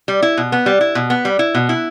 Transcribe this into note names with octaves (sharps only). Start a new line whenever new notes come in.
G3
E4
B2
B3
G3
E4
B2
B3
G3
E4
B2
E4